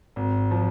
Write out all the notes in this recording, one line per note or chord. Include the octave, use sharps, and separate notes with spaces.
G#1
F3